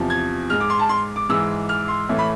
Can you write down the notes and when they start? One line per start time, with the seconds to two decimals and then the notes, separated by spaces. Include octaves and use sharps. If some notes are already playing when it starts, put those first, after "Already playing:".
Already playing: E2 C3 F3
0.10 G#6
0.50 G#2 G#3 F6
0.60 D6
0.70 C6
0.79 A5
0.89 C6
1.16 D6
1.29 G#2 E3 G#3 E6
1.69 F6
1.88 C6
2.09 A2 E3 A3
2.19 B5